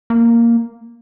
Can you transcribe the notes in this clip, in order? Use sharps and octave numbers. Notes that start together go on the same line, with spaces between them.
A#3